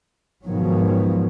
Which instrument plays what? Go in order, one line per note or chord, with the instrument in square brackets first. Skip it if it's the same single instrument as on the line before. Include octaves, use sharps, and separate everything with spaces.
[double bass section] G#2 B2 D#3 F3 F#3